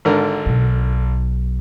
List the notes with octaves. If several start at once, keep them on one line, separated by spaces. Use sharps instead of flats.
G#1 D3 A#4
B1